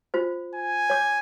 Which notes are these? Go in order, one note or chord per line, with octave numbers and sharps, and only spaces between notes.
F4 C5
G#5
C#5 D6